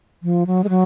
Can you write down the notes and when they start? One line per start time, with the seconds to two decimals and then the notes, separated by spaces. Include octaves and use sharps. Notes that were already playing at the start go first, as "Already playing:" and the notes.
0.23 F3
0.47 F#3
0.64 G#3
0.69 F#3